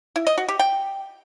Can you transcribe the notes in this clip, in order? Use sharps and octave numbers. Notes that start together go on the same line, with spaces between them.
E4
D#5
F#4
G4
G5